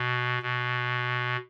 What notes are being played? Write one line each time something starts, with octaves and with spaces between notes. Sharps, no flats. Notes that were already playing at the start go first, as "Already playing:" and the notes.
Already playing: B2
B2